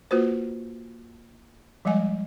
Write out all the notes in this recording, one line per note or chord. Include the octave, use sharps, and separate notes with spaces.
A#3 F4 F#4 B4 C5
F3 G3 G#3 D#5 G#5